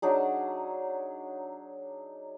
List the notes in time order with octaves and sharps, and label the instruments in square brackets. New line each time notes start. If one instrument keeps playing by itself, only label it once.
[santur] F#3 D4 D#4 G#4